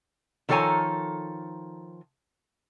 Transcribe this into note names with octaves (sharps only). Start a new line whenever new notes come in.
D#3 F3 A4 C#5 G#5 A#5